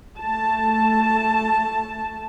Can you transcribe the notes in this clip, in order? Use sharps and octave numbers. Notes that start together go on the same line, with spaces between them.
A3 A5